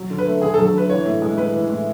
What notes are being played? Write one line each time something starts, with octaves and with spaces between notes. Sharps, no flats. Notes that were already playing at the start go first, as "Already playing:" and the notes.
Already playing: F#3
D3
B4
A3
D3 G#4
A4
F#3
A4
D3 B4
E3 C#5
A2
G#3
A2 B4
E3
A2